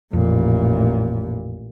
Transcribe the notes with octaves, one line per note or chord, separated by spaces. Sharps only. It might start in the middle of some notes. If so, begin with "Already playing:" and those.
A1 F2 A#2